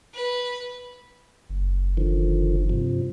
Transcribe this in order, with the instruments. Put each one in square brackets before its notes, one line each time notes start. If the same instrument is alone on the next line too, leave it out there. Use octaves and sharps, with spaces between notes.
[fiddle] B4
[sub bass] F#1
[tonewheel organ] D3 D#3 F3
G2 C3 F3